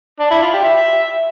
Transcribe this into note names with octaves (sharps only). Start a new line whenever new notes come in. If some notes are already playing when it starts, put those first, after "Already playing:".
D4
E4
F4
G4
E5